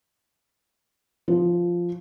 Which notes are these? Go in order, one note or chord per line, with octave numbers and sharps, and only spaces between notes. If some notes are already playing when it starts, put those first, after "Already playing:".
F3